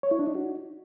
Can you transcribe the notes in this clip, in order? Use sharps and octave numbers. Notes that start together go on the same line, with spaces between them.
C#5
E4
D4
D#4
F#4